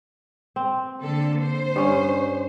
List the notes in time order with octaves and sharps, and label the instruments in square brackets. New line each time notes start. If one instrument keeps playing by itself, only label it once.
[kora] C4
[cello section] D3 A#3 A4
C5
[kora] G2 C#4